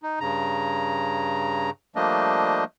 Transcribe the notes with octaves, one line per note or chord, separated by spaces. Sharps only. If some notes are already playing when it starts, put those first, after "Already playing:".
D#4
G2 C#3 A#5
F3 G3 A3 A#3 D4 D#5